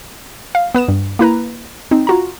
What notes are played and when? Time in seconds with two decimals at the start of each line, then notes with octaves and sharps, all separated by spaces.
0.55 F5
0.75 B3 B4 D#6 E7
0.88 G2
1.19 A#3 E4 B4 A#5
1.91 C4 D#4
2.07 F4 F#4 A#5